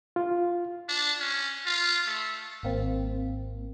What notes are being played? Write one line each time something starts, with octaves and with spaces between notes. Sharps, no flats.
F4
D4
C#4
F4
A3
G#1 A#3 C4